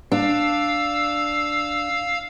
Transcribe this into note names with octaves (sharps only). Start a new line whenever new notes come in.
D4 F5 E6